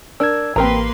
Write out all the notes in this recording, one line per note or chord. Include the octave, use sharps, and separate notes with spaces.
D4 A#4 E6 G#6
A1 A#3 C4 A#4 B4 A#5 C6